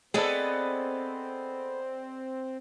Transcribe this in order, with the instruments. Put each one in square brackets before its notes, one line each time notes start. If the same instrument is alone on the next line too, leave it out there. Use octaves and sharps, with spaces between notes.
[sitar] B3 A4 [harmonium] C4 [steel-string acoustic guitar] G#4 D5 D#5